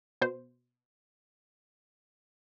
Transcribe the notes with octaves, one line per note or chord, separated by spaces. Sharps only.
B2 C5